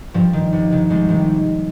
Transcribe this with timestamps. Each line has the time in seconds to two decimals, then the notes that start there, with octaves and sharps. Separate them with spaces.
0.14 G2 F3
0.33 D#3
0.52 C2
0.71 C3 D#3
0.90 C2 G#3
1.09 C3 D#3